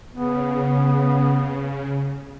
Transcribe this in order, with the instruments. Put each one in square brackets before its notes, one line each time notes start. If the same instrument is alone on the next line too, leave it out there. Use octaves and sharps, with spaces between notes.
[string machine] C#3 [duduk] B3